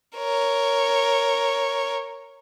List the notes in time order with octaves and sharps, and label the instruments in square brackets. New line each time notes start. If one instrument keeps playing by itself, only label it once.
[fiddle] A#4 C#5